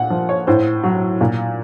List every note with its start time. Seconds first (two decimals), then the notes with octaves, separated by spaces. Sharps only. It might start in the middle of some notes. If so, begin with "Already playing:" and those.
Already playing: A#2 F#5
0.10 F3
0.29 C#5
0.47 A2 C5
0.84 F#3
1.21 A#2